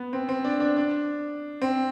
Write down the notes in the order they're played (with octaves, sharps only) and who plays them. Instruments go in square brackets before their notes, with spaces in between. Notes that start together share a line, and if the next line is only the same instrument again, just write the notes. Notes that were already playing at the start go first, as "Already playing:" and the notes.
Already playing: [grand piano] B3
C4
C4
D4
D4
D4
C4